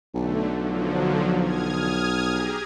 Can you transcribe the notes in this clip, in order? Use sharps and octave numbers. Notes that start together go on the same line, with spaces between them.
B1 D3 A3
D3 F3 F#3
D#6 F6 G#6
G4 G#4 A#5